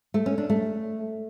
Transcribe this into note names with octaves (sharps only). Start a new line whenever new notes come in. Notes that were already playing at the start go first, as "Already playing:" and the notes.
A3
C#4
D4
A3